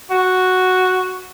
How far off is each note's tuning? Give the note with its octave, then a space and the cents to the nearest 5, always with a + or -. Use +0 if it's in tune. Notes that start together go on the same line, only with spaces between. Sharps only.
F#4 +0